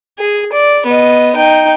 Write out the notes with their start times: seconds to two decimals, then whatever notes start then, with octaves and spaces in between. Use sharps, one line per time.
0.18 G#4
0.52 D5
0.86 B3 D#5
1.36 D#4 G5